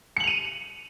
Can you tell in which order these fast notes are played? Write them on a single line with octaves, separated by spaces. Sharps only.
C#7 F#7 F7 D#7